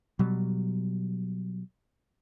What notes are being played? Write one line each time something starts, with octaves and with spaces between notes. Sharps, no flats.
B2 F#3 G3